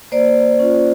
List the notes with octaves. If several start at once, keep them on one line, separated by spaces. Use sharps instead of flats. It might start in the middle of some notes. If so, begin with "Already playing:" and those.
A#3 C5 D5
C#4 F4